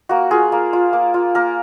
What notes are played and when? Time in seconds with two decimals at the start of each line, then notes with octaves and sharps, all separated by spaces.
0.09 A#3 F#4
0.31 F4 G#4
0.52 A#3
0.73 F4
0.93 A#3
1.14 F4
1.35 A#3 A#4